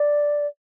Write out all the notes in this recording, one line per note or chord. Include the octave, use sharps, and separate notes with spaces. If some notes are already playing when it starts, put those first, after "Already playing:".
Already playing: D5